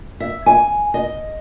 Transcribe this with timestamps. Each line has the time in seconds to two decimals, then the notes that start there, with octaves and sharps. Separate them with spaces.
0.20 E5
0.46 G#5
0.94 D#5